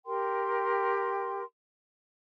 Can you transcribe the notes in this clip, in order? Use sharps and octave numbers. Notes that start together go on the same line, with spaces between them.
G4 A#4 G5 C6